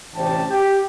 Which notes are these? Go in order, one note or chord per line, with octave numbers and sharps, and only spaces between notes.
A1 D2 C3 G4 A5
G4